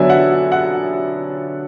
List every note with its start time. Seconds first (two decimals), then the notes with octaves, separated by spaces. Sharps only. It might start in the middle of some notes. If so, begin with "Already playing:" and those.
Already playing: D3 F#3 B3 D4 E5 G#5
0.09 F#5
0.52 F#5